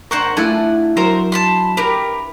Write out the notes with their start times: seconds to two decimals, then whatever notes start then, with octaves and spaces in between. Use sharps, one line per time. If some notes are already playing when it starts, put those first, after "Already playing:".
0.11 D4 A#4 C5 F#5 C#6
0.37 A3 D4 E4 F4 A4 F#5 G#5
0.97 F#3 A#4 C5 A#5
1.32 A5 B5 C6
1.77 G4 A#4 B4